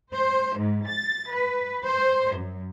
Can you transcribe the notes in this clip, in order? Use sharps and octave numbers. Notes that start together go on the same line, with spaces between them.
C5
G#2
A6
B4
C5
F#2